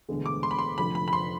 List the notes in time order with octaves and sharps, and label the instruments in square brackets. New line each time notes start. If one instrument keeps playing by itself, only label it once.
[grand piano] E1 D2 D3 G#3 B3
[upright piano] D6
C6
B5
C6
[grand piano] F1 F2 D3 A3 [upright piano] B5
[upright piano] B5
B5
C6